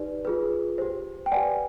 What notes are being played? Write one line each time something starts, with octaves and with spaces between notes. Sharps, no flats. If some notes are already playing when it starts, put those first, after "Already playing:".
Already playing: D#4 G4 B4 D5
F4 G#4 B4
G4 C5
G5
G4 B4 D5 F#5 G#5